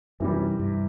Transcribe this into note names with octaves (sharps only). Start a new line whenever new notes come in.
F#2 C3 E3 G3
G2